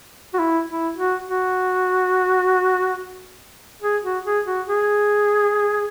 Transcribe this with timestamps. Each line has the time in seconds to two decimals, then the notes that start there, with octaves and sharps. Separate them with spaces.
0.34 F#4
0.39 E4
0.69 E4
0.97 F#4
1.26 F#4
3.82 G#4
4.04 F#4
4.25 G#4
4.46 F#4
4.67 G#4